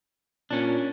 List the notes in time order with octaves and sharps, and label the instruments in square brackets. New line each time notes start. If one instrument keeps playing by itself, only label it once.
[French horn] A#2 [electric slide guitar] C#4 D4